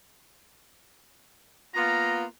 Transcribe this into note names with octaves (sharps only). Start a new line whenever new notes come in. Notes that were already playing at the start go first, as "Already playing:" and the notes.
A#3 B3 F4 A#5